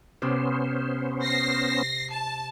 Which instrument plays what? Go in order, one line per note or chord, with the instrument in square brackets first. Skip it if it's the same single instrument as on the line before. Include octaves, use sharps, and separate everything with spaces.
[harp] C3 [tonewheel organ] B3 C#4 C5
[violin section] A#6 C7
A5